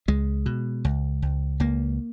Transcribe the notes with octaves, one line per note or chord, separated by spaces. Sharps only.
C#2 G#3
B2
C#2
C#2
C#2 A#3